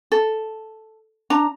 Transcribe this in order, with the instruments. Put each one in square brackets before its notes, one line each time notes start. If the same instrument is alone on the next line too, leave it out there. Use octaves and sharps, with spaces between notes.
[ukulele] A4
D4 A#5